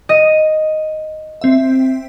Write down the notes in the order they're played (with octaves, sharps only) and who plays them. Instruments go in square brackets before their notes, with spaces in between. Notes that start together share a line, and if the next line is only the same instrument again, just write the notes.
[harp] D#5
[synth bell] C4 E5